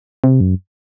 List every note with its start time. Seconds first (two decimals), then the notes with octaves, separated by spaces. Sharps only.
0.24 C3
0.41 F#2